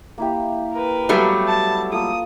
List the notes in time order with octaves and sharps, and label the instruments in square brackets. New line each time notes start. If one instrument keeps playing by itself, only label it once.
[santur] A#3 E4 G4
[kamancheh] A#4 B4
[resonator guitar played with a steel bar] F#3 G3 A3 [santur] B3 A4
[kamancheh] A5
[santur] A#3 F4 A4 [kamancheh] D#6